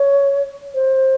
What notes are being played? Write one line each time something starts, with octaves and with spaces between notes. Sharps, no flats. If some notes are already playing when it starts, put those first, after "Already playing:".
Already playing: C#5
C5